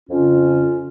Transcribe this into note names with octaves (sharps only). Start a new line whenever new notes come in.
F2 C#3 C#4 F4